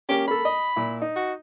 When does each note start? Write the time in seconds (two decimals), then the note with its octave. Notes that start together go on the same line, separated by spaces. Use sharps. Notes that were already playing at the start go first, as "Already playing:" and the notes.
0.09 A#3 C#4 G4
0.28 A#3 A4 B5
0.45 D#5
0.76 A#2 E4
1.02 D#4
1.16 F#4